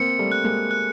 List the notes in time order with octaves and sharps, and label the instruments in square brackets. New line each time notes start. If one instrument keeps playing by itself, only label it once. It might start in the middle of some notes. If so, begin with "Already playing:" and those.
Already playing: [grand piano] A#3 C4 [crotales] C#7
[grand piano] G3 A3
[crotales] F#6
[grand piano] G#3 A#3
[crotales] F#6